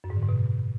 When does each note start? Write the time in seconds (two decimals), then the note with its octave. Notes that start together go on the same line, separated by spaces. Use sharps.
0.04 F#2
0.10 G#2
0.16 D3
0.22 G#2
0.29 B2